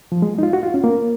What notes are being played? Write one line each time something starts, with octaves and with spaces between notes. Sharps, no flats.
F3
G#3
D#4
F4
F#4
F4
C#4
A#3